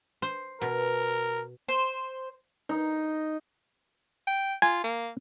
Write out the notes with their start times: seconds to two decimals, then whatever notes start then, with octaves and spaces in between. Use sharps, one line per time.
0.22 C5
0.62 B2 A#4
1.68 C5
2.69 D#4
4.27 G5
4.62 F4 G#5
4.84 A#3